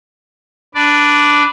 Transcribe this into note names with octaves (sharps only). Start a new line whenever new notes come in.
D4 B4 D5